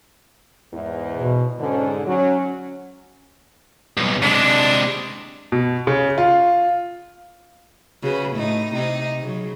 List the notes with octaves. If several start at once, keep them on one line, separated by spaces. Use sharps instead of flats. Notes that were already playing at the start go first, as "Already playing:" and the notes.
E2 G#2 E3
B2
G#2 D3 C#4
F#3 C#4
B1 G2
C3 G#3 D4
B2
C#3
F4
C#3 F#4 B4
A2 A3 D#4
C3 C4 D#4
C#3 F#3